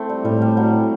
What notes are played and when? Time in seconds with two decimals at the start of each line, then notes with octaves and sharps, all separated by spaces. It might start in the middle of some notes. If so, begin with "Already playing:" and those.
Already playing: A3 C4 E4
0.09 G3
0.25 A2 G3
0.42 G3
0.57 F#3